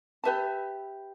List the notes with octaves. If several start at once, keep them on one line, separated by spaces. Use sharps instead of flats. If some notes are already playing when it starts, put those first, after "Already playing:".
G4 B4 E5 A5